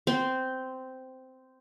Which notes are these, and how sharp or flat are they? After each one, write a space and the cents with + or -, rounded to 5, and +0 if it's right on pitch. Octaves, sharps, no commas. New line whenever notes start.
C4 -10 C6 +0